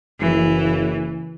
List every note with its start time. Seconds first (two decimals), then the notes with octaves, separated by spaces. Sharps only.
0.20 F#1 E3